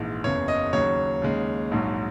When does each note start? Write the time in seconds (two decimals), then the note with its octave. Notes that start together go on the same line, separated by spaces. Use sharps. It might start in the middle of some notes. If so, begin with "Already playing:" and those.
Already playing: A#1 G#2 E3 G#3
0.24 F#1 E2 C#3 C#5
0.48 D#5
0.73 D#2 C#3 F#3 C#5
1.22 D#2 C#3 G#3
1.71 A#1 G#2 F#3